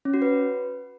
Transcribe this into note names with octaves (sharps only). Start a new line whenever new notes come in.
C#4
F#4
B4